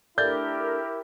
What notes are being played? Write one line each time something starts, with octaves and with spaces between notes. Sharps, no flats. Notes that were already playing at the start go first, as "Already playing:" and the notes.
A3 D4 E4 G4 A#4 G6 A6